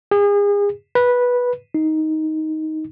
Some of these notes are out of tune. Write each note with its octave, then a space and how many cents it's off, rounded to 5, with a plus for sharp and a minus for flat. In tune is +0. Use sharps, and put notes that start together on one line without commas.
G#4 -35
B4 -10
D#4 +10